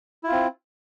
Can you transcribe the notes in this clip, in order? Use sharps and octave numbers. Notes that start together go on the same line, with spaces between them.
C4 E4 F4